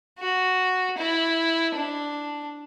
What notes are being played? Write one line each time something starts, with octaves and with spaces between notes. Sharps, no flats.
F#4
E4
D4